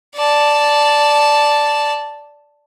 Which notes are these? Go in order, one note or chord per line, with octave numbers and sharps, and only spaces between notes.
D5 A5